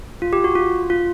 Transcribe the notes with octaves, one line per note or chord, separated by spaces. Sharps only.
F4
G4
F#4
F4
F4